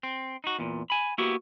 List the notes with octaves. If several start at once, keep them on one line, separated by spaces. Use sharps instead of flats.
C4
D#4 F#4
E2 A#2
G#5 B5
A#3 B3 E4 F#4 G4